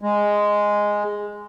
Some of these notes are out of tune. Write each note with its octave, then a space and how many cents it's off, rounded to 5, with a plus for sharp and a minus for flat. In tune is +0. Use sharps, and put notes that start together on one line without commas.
G#3 -5